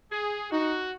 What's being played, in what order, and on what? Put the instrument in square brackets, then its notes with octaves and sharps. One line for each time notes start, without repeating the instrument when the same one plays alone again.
[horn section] G#4
[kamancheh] D#4 [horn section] F#4